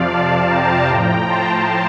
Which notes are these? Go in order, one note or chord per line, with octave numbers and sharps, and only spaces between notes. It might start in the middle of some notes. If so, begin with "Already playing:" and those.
Already playing: F2 C3 F3 D5 F5
F5 A5
G5 A#5
A2 F3
A5 C6